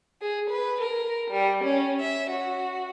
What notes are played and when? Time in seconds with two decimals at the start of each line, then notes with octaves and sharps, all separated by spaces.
0.21 G#4
0.50 B4
0.81 A#4
1.31 G3
1.64 C#4
2.01 E5
2.30 F#4